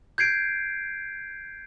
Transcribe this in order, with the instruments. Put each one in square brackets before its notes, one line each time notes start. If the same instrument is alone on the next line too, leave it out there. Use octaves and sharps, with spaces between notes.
[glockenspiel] G6 G#6 C7 D7